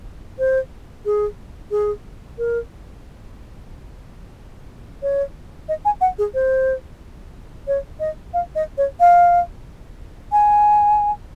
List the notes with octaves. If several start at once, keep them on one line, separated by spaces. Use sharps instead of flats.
C5
G#4
G#4
A#4
C#5
D#5
G#5
F#5
G#4
C5
C#5
D#5
F5
D#5
C#5
F5
G#5